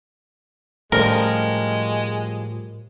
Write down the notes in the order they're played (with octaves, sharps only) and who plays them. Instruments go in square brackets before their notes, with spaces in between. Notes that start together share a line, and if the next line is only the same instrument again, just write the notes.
[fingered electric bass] A2 [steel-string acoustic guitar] F3 G3 C#4 [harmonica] G#3 [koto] A#4